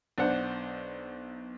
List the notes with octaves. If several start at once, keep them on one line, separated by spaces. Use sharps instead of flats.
B1 D4 C5 F#5